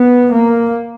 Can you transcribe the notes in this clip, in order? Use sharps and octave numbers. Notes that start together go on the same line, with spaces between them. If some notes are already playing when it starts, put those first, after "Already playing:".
Already playing: B3
A#3